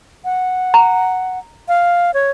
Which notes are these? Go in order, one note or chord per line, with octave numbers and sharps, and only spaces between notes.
F#5
A#5
F5
C#5